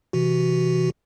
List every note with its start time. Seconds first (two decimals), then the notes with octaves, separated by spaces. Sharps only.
0.13 C3 E3 F#4